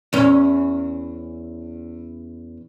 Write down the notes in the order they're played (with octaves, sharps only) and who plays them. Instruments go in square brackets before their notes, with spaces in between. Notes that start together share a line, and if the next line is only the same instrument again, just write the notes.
[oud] E2 C#4